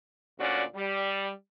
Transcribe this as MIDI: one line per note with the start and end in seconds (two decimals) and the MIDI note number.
0.39 0.63 38
0.39 0.63 46
0.39 0.63 61
0.39 0.63 66
0.39 0.63 74
0.75 1.31 55